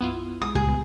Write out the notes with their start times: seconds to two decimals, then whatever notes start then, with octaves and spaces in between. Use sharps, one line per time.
0.01 B1 F#2 B3 E4 F4 D#7
0.42 B1 G#3 G#4 D#6
0.55 C#2 A#2 G3 G4 G#4
0.69 B3